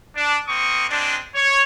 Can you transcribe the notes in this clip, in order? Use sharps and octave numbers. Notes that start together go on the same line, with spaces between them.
D4
A#3 C4 C#6 D#6
G#3 C4 D4
C#5